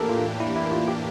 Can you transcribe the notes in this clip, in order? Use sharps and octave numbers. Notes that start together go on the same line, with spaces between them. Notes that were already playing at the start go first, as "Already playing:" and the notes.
Already playing: A2 E3 A#3 D4 G4 A4 A#4
F4
E4
E4
F4
G4